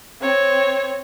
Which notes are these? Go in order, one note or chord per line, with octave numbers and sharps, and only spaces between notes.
C4 C#5